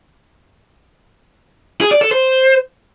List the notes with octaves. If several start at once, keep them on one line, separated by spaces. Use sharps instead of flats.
G#4
D5
A4
C5